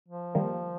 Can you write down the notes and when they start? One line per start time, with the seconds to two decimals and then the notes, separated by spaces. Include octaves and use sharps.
0.08 F3
0.35 D#3 F3 G3 A#3